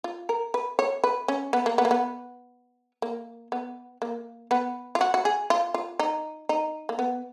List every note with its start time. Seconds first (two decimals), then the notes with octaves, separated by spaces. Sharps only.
0.04 F4
0.29 A#4
0.54 B4
0.79 C#5
1.04 B4
1.28 C#4
1.53 B3
1.66 A#3
1.78 B3
1.85 A#3
1.91 B3
3.02 A#3
3.52 B3
4.02 A#3
4.51 B3
4.95 F4
5.01 F#4
5.14 F#4
5.25 G#4
5.50 F4
5.74 F4
5.99 D#4
6.49 D#4
6.89 A#3
6.99 B3